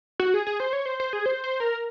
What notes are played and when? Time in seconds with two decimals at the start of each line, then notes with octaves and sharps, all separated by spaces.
0.20 F#4
0.34 G#4
0.47 G#4
0.60 C5
0.73 C#5
0.86 C5
1.00 C5
1.13 G#4
1.26 C5
1.44 C5
1.60 A#4